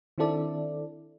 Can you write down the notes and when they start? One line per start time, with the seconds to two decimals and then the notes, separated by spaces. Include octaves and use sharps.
0.18 D#3 C4 D4 E4 A4 D5